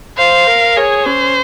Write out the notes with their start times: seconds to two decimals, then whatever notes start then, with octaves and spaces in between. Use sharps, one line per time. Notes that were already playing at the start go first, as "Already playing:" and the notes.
0.17 C5 F5
0.47 A#4
0.77 G#4 C#5
1.06 C#4 C5